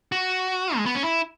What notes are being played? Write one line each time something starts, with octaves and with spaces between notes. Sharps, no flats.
F#4
G#3
B3
C#4
E4